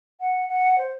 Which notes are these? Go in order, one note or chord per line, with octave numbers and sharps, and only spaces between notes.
F#5
F#5
C5